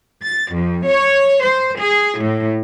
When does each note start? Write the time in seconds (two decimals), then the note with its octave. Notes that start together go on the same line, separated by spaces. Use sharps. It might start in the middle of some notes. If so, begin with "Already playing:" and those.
0.24 A6
0.53 F2
0.88 C#5
1.44 C5
1.80 G#4
2.21 A2